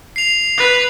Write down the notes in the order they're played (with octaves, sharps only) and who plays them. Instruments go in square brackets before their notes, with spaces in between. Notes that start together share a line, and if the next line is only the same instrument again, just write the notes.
[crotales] C7 F7
[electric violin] B4